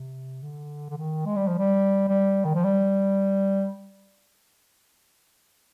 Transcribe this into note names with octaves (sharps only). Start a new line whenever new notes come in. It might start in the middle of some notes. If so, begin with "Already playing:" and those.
Already playing: C3
D3
D3
D#3
G#3
G3
F3
G3
G3
D#3
F3
G3